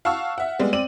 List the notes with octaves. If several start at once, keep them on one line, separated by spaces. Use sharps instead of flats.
F5 F#5 A5 C#6 E6 F6
E5 F#5
G3 G#3 B3
C4 D5 D#7 F#7